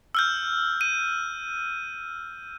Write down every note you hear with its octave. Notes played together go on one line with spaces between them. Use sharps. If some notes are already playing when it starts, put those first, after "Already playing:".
E6 F6 G6
D#7